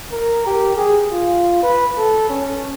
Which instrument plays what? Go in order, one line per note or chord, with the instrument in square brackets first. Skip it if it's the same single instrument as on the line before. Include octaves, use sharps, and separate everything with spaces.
[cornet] A#4
G4
G#4
F4
B4
A4
C#4